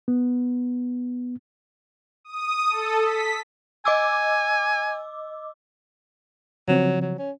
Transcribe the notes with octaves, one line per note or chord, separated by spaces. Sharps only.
B3
D#6
A4
B6
D#5 G#5 D6 E6
C#3 F3 F#3 C4
F#3
C#4